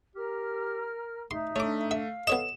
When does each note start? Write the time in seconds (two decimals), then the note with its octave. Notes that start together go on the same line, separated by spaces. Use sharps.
0.15 G4 A#4 F6
1.31 A3 D#4 E5 C6
1.56 A3 D4 C#5 D6
1.91 E5 F5
2.27 B3 A4 C#5 D#5 E7